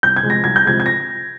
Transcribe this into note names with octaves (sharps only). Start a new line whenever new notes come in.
C2 G6
G#6
C3 F3 G#3
A#6
C2 G#6
G6
C3 F3 G#3 G#6
G#6
A#6